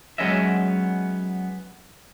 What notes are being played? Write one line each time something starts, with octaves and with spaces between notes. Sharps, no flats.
F#3 G#3 B3 C#4 D#5 E5